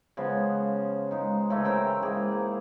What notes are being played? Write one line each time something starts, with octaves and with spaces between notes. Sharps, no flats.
C#3 F3 G#3 B3
G#3 D#4
C#3 E3 A3
E4 A#4 C5 G5
G#2 A#3 G#4